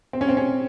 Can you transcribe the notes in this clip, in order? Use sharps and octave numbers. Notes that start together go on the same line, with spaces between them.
C4
C#4
C4
C#4